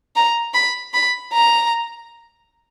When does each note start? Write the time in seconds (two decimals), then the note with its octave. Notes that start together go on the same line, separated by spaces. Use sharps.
0.16 A#5
0.54 B5
0.94 B5
1.33 A#5